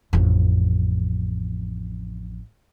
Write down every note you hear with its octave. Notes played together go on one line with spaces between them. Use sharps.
A1 F2